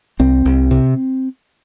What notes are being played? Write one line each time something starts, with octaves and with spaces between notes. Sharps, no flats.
C2 C4
C2
C3